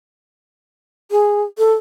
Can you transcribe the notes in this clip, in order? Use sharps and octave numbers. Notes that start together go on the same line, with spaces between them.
G#4
A4